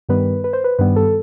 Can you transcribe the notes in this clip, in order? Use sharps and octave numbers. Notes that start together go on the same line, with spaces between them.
G2 D#3 G3 B3 B4
B4
C5
B4
G2 D#3 G3 B3 B4
A4